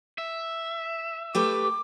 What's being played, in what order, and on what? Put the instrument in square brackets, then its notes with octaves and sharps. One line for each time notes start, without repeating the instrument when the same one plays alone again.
[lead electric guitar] E5
[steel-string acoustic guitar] A3 G4 B4 [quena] D6